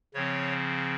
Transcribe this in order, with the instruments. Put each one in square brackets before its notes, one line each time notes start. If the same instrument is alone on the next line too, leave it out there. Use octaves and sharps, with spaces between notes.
[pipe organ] C#3 F3 C4 C#5